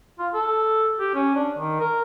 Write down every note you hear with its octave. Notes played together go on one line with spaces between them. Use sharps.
F4
A4
G4
C#4
D4
D#3
A#4